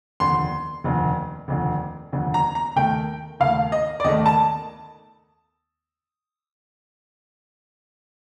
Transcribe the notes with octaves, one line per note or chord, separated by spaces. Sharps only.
F1 D#2 D3 C6
F1 D#2 D3
F1 D#2 D3
F1 D#2 D3
A#5
A#5
D#2 D#3 A3 G5
D#2 D#3 A3 F5
D#5
D5
D#2 D#3 A3 D#5
A5